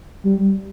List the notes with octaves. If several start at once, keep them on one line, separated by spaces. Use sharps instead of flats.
G3